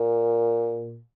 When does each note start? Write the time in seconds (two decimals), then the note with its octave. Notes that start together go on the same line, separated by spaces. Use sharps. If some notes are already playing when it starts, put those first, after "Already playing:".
Already playing: A#2